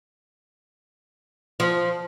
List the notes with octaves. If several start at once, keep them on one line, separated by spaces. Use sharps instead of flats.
F3